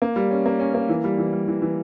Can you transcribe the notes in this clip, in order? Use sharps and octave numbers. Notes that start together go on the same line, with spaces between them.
A#3
G3
C#4
A#3
C#4
A#3
E3
G3
E3
G3
E3
E3